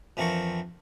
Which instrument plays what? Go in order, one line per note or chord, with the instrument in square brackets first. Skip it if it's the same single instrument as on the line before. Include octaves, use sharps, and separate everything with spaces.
[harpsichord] F2 E3 C4 D4 A#4 C#6